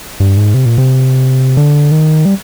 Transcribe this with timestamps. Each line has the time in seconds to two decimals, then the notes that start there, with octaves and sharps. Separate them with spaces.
0.20 G2
0.37 G#2
0.54 C3
0.66 A#2
0.78 C3
1.57 D3
1.92 D#3
2.25 G3